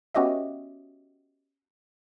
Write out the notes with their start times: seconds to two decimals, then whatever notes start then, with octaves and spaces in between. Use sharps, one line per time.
0.14 B3 C#4 F#4 G4 D#5 E5